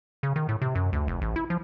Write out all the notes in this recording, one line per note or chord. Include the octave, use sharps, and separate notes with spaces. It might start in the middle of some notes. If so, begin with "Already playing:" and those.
C#3
D#3
A2
C3
F#2
D2
F1
A1
E4
F3